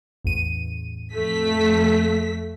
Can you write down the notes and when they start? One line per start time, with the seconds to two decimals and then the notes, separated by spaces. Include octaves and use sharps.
0.24 A1 E2 D#7
1.13 F2 A3 B6